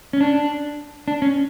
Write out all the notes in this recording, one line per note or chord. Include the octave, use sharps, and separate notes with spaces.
C#4
D4
D4
C#4